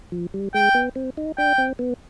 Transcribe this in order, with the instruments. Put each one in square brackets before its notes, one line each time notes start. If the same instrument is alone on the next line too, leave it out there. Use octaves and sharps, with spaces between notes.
[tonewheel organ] F3
G3
[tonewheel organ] G#3 [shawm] G5
[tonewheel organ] B3
C4
D#4
[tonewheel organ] D4 [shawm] G5
[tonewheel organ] C4
B3